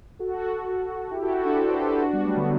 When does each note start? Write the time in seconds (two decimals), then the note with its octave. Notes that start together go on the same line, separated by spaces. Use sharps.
0.19 F#4 A4
1.11 E4 G4
1.22 F#4 A4
1.33 E4 G4
1.45 D4 F#4
1.56 A4 C5
1.68 G4 B4
1.79 F#4 A4
1.91 E4 G4
2.02 D4 F#4
2.13 G3 B3
2.25 F#3 A3
2.36 D3 F#3